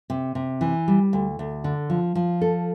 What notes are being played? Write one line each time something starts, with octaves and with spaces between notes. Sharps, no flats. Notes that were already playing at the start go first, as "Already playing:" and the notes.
C3
C3
E3
G3
D2
D2
D3
F3
F3
A4